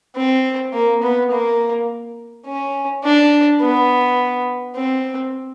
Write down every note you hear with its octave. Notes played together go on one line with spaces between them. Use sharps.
C4
A#3
B3
A#3
C#4
D4
B3
C4